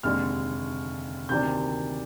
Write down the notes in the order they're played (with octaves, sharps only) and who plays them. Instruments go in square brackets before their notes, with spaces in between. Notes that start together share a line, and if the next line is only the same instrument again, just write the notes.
[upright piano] F1 D#2 D3 G#3 F6
D2 C3 D#3 A#3 D4 G6